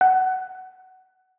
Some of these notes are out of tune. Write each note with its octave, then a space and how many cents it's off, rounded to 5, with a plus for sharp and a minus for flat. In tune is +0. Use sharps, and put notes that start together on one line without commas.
F#5 +15